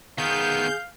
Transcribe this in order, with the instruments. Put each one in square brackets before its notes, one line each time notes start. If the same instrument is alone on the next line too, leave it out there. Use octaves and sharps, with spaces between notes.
[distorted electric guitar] D#3 B3 [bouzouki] G#4 [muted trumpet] F5 [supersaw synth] G6